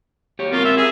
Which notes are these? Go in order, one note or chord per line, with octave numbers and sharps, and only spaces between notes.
G4 C#5
C4 F4 A#4
E5
G#4